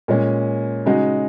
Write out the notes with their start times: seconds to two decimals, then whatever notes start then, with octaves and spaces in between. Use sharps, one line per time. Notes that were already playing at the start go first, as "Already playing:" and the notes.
0.08 A#2 G#3 C#4
0.86 C#3 G#3 D#4 F#4